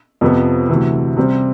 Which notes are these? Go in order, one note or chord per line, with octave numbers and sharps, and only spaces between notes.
F2 C3 F3 B3
D2 C3 E3
C3 G3 C4